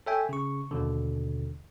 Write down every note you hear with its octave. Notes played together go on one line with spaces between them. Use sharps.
A4 C#5 E5 G5 G#5
C#3 C#6
D#2 B2 D3